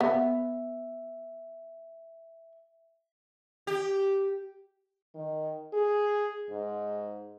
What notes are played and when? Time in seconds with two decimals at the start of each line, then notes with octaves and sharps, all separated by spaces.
0.01 B3 E5
3.67 G4
5.15 D#3
5.73 G#4
6.50 G#2